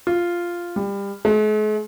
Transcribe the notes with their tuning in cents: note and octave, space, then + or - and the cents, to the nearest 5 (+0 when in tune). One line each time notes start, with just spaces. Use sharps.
F4 -5
G3 +25
G#3 +45